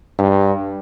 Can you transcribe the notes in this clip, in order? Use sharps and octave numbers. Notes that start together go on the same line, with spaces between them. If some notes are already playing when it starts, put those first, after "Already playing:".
G2